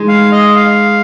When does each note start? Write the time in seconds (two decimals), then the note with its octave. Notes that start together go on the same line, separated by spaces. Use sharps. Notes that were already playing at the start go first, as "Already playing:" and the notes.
Already playing: G#3 D#4
0.08 F5
0.32 D#5
0.56 F5